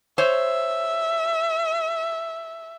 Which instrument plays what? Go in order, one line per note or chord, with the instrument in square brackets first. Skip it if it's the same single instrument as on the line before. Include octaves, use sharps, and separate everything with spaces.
[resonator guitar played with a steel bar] C5 C#5 [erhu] E5